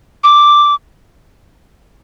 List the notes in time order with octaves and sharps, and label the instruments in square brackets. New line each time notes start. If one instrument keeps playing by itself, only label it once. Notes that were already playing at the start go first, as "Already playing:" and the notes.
[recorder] D6